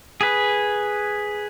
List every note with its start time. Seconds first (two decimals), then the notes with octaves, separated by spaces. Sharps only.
0.21 G#4 B4